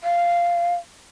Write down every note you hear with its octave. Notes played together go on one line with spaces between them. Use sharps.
F5